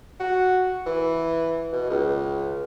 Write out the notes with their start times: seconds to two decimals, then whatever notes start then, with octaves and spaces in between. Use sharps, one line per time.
0.20 F#4
0.86 E3
1.73 B2
1.90 C#2